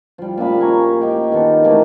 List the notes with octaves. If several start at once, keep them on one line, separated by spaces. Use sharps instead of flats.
F3 G3
A#2 D4 F5 B5
G#5 A#5 C#6
G4 D#5 G5
D#3 B3 A4
C3 E3 A3 A#3